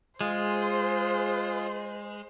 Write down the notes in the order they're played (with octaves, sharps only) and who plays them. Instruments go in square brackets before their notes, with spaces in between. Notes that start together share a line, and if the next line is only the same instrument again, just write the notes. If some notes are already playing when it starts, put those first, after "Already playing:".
[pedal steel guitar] G#3 [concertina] F4 G#4 C6 [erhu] C5